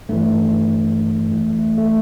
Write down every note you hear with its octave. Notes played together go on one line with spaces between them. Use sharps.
G2 E3 A3
F2 E3 A3
A3
A3